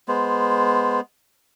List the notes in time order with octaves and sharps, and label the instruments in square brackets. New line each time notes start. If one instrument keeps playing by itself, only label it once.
[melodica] G#3 B3 C5